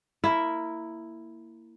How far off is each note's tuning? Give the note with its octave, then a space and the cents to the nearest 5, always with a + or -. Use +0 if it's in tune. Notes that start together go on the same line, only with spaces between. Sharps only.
A#3 -15 E4 +0